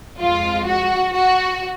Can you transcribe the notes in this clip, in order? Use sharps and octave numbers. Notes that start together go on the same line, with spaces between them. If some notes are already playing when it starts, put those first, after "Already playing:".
F2 F3 G#3 F4
F#4
F#4